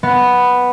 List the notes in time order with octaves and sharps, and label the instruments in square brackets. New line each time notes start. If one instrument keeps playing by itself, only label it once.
[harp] B3